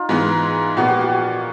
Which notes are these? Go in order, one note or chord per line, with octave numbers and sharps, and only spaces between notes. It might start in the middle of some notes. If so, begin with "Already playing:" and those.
Already playing: D#4 F4
G#2 E3 G#3 B3
A#2 F3 G#3 B3 F#4
G4
F#4